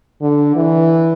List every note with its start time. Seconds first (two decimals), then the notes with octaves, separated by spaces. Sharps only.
0.22 D3
0.56 E3